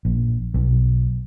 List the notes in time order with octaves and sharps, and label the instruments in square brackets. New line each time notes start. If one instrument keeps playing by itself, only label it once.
[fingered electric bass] A#1
B1